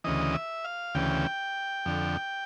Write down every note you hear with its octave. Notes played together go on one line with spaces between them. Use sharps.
D2 C#3 E3 D#5
E5
F5
D2 C#3 E3 G5
F2 D3